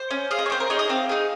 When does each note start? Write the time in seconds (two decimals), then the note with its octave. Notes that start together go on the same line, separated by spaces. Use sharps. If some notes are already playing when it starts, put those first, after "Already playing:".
Already playing: C5
0.11 C#4
0.31 G#4 F5
0.39 D#5
0.46 C#5
0.50 C4 C5
0.60 A#4
0.70 D#4 G#4 C#5
0.79 D#5
0.89 C4 F5
1.09 D#4 G#4